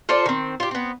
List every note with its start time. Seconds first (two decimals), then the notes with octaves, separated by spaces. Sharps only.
0.09 F4 A4 C5 D5
0.26 D#3 C4
0.60 F4 G4
0.71 B3 C4